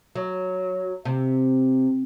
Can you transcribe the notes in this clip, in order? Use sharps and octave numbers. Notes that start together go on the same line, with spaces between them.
F#3
C3